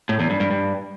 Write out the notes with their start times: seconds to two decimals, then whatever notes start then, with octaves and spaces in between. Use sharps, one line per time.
0.09 A2
0.20 E2
0.30 G2
0.40 G2
0.51 G2